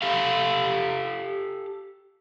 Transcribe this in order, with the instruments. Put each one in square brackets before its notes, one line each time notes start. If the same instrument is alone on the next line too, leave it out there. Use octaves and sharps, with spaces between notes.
[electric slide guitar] G4 A4 F5